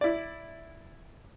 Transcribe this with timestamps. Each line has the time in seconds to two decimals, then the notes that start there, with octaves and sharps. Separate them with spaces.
0.01 E4 D5